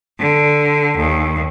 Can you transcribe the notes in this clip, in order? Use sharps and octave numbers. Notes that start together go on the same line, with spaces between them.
D3
D#2